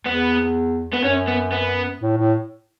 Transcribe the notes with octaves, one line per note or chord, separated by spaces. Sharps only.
E2 B3
B3
F#2 C#4
B3
B3
A2
A2